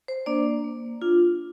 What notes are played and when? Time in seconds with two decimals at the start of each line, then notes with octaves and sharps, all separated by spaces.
0.08 C5
0.26 A#3 D4 D5
0.64 A#3
1.02 D4 F4